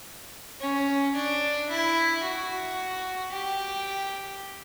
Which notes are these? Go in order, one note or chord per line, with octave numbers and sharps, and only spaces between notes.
C#4
D4
E4
F#4
G4